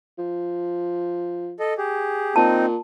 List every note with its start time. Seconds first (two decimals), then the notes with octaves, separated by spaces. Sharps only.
0.18 F3
1.60 A4 D#5
1.78 G4 G#4
2.36 A#2 C4 D#4 A5